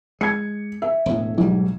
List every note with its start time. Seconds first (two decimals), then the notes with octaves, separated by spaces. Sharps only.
0.21 G#3 G#6 C#7
0.82 E5
1.06 E1 A2
1.38 B1 G#2 G3